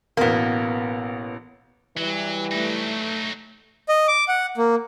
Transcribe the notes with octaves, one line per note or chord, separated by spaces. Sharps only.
A1 B2 A#3 B3
E3 F#3 G3
F#3 A3 D#4
D#5
D6
F#5
A#3